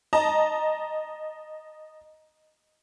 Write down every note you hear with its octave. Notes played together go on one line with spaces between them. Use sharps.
D#5 A5 A#5